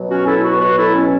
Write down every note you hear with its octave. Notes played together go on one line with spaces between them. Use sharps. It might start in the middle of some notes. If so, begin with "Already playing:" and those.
Already playing: B2 F#3
C#4 F#4
E4 A4
F#4 B4
F#4 B4
E4 A4
C#4